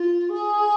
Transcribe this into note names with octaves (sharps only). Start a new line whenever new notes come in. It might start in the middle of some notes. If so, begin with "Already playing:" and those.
Already playing: F4
G#4